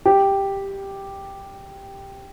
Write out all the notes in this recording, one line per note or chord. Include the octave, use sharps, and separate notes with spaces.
G4